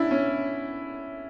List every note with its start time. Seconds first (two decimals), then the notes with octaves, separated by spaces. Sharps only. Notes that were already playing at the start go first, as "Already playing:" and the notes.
Already playing: C#4 D4 E4
0.11 C#4